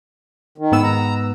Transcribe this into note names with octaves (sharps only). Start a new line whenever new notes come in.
D#3
G#2 B3 E6
A#5